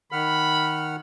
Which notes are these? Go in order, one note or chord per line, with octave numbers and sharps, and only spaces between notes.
D#3 F#5 B5 F6